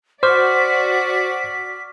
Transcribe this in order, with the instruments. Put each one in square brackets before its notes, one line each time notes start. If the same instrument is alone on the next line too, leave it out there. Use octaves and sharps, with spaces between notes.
[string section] F#4 D5 [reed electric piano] C5 [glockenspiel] C#6 D6 F6 [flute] B6